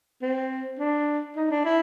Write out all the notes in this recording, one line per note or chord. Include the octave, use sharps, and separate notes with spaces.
C4
D4
D#4
D4
E4